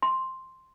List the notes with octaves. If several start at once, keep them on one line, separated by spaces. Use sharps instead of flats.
C6